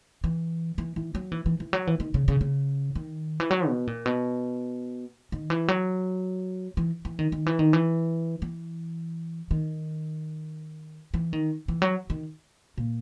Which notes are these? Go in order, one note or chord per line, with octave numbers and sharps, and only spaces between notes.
E3
E3
E3
F#3
E3
E3
E3
F#3
E3
D#3
C#3
C#3
C#3
D#3
E3
F#3
B2
A#2
B2
D#3
E3
F#3
E3
E3
D#3
D#3
E3
D#3
E3
E3
D#3
E3
D#3
E3
F#3
D#3
A#2